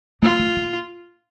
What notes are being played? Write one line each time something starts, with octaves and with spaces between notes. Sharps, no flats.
A#2 F4
A2
A#2